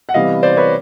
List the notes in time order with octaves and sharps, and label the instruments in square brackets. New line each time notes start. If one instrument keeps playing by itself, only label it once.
[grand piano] F#5
C3 E3 G3 B3 D#5 F5
C5 D5
B4 C#5